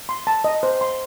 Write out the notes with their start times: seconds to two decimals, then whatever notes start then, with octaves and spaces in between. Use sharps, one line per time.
0.09 C6
0.27 A5
0.44 D#5
0.63 C5
0.81 C6